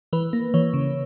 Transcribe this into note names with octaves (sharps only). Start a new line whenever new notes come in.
E3 B4
A#3
E3 C#5
C#3